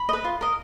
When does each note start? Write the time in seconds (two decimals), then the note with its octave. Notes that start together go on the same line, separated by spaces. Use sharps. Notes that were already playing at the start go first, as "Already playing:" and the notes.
Already playing: B5
0.09 D#5
0.13 B4
0.24 F4
0.41 A#4 D#5